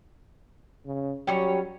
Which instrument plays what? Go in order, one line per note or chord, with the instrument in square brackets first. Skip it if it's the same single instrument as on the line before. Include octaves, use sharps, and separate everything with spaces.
[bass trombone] C#3
[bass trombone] F#3 [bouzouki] G3 C#4 C#5